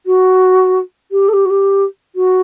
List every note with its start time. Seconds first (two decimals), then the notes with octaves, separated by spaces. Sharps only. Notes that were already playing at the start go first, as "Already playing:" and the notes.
0.06 F#4
1.11 G4
1.28 A4
1.33 G4
1.45 F#4
1.50 G4
2.15 F#4